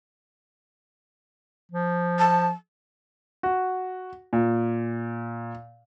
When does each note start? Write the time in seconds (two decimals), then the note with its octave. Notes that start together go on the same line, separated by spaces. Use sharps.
1.72 F3
2.19 A5
3.43 F#4
4.33 A#2